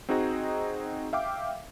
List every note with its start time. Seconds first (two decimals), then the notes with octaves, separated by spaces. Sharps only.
0.09 C4 D#4 F#4 G#4 D#5 A#5
1.13 E5 F5 G5 D6